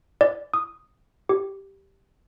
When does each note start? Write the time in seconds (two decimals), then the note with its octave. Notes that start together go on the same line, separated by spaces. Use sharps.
0.21 D5
0.54 D#6
1.29 G4